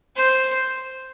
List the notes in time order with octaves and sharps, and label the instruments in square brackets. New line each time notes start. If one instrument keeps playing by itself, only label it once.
[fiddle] C5